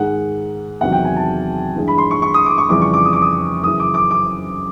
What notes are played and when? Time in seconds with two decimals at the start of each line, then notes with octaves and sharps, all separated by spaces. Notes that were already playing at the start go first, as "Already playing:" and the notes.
Already playing: G#2 D#3 G#3 F#5
0.81 E2 C3 D#3 F#3 F#5
0.92 G5
1.05 G#5
1.16 A5
1.75 G2 E3 G#3
1.88 B5
1.98 C6
2.11 C#6
2.22 C#6
2.34 D#6
2.46 D6
2.58 C#6
2.69 F2 C#3 E3 G3 D6
2.82 C#6
2.94 D6
3.05 D#6
3.13 D6
3.22 D#6
3.63 F#2 C#3 E3 D#6
3.80 D6
3.94 D6
4.11 D6